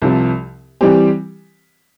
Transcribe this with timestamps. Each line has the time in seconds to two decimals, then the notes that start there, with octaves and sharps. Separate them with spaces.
0.02 C2 C3 F3
0.81 E3 G3 C4 G4